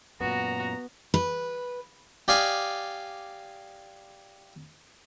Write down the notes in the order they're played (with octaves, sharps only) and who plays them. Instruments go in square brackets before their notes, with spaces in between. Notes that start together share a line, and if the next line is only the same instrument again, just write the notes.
[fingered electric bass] F#2 A#2 [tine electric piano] B3 [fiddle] F#4 [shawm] A#5
[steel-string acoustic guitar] B4
[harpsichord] G4 D5 D#5 F5 G#5